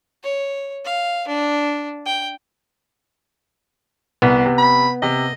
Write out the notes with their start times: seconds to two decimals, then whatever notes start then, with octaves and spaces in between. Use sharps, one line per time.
0.23 C#5
0.85 F5
1.28 D4
2.06 G5
4.22 C2 B3
4.46 C3
4.58 B5
5.03 C3 D#5